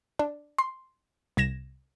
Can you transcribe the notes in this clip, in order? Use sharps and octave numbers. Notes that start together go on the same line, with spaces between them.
D4
C6
C2 G#6 A#6 E7